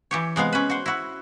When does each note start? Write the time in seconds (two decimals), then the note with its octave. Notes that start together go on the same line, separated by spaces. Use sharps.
0.11 E3 G4 C#5
0.36 C3 G#3 B3 F5
0.53 C#4 B4
0.70 F#4 C5
0.86 E4 F#4